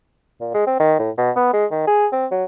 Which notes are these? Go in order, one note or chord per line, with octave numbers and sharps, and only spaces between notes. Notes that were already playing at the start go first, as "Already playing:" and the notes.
A#2
G#3
C4
D#3
A2
B2
B3
G#3
D#3
G#4
C4
F#3